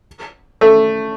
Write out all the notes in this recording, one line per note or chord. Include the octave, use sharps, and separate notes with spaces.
A3